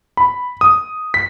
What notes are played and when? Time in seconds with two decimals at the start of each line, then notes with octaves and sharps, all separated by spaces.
0.17 B5
0.61 D#6
1.14 B6